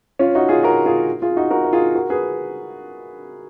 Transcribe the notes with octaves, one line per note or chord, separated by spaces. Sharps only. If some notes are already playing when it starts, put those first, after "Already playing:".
C#4 F4
D#4 F#4
F4 G#4
F#4 A#4
F4 G#4
F4 G#4
D#4 F#4
F#4 A#4
A#4
F4 G#4
F#4 A#4
G#4 B4